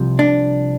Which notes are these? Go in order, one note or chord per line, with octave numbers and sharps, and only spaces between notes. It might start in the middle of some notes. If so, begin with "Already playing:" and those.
Already playing: C2 C3 F3
D4